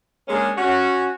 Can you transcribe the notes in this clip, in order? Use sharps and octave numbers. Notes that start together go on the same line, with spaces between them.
G#3 A#3 C#4 D4 G#4
C#4 F#4